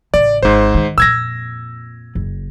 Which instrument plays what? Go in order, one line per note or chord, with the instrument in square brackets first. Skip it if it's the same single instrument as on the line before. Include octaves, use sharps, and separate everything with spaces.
[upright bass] A1 C#3 [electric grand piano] D5
[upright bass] G#1 [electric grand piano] G#2 C5
[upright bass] D#3
[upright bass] F2 A#2 [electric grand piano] E6 G#6 A#6
[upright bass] F#1